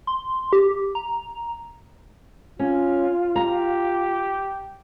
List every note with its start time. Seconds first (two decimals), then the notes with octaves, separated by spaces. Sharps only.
0.07 C6
0.53 G4
0.95 A#5
2.59 C#4 F4
3.36 G4 A#5